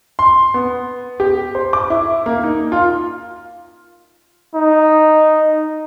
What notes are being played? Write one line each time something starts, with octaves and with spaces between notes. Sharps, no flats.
C6
B3
G4
C5
D6
E4
A#3
D#4
F4
D#4